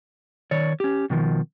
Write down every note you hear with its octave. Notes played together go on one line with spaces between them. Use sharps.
D#3 C#5 D5
C#4 G4
B2 D#3 F3